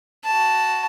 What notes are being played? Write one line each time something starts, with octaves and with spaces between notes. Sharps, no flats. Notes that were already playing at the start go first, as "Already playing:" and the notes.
F#4 A5